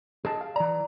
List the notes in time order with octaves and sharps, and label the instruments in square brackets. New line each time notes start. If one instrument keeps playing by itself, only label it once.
[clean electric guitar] G#4 D#5 A5
F5
[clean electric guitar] E3 A#5 [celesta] D5